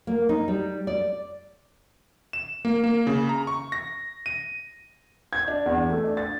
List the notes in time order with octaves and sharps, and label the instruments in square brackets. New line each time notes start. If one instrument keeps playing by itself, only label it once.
[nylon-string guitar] A#3
D#4
G3
D5
[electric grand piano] E7
A#3
A#3
C#3
A#5
C#6
A#6
D#7
[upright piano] G#6
D4
E2
A3
D4
A6